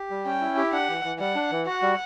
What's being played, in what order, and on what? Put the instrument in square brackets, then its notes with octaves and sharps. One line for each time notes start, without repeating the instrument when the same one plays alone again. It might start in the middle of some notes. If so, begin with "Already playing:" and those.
Already playing: [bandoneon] G4
G3
[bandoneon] C#4 [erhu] G5
[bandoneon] E4
G4
[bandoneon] D4 [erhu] F#5
[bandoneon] E3
E3
[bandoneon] G3 [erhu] F#5
[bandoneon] D4
E3
[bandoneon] F#4 [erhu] F#5
[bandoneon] G3